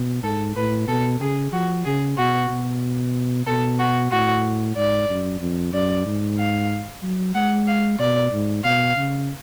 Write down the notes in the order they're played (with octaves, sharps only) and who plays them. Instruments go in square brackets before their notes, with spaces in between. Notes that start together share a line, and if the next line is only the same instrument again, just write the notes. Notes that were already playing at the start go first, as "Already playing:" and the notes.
Already playing: [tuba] B2
[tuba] G#2 [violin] A4
[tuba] A2 [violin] B4
[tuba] B2 [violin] A4
[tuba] C#3 [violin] G#4
[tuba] F3 [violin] F#4
[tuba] C#3 [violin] G#4
[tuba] B2 [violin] F#4
[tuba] B2
[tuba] B2 [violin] A4
[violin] F#4
[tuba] A2 [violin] F#4
[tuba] G#2 [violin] D5
[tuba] F#2
F2
[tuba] F#2 [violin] D5
[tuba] G#2
[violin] F5
[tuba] F#3
[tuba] G#3 [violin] F#5
[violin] F5
[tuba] B2 [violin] D5
[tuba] G#2
[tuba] B2 [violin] F5
[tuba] C#3